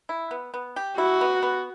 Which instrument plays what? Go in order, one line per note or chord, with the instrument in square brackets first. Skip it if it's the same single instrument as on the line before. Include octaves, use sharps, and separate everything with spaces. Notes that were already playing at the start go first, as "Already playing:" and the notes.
[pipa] E4
B3
B3
G4
[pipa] E4 [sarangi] F#4
[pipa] B3
B3